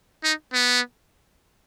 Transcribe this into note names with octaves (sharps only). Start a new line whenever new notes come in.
D#4
B3